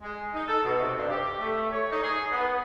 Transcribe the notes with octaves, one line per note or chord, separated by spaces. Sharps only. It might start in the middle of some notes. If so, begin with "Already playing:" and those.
G#3
D#4
A4
B2
C3
G2
G4
A3
C#5
D#4
G#4
B3